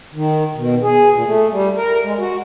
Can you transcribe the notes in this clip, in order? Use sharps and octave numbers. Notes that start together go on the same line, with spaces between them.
D#3
B2
G#4
A#2
A3
G3
A#4
G#3
F#4